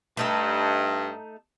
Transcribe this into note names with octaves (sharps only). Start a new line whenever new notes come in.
G2 A3 D#4 A4